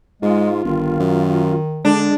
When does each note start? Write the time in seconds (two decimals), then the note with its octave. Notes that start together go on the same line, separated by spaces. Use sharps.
0.22 G#2 G#3 F4
0.64 G1 D#3
0.99 F#2
1.85 D3 G#3 D4